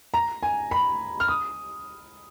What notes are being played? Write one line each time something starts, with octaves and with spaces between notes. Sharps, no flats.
A#5
G#5
B5
F6
D#6